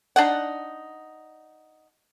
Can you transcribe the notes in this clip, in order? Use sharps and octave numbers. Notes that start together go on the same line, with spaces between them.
D4 D#4 F#5